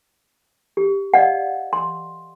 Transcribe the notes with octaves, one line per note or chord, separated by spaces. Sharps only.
G4
D5 D#5 F5 F#5
C6